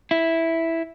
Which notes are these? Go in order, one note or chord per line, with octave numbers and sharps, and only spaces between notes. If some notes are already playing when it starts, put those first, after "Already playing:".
E4